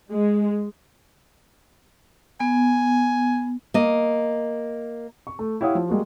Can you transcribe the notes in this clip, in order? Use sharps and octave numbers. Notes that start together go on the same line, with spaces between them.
G#3
B3 G#5
A#3 D#5
C#6
A3
E4 G4 C#5 F5 F#5 D#6
F3
G3 G#3 A#3 F#4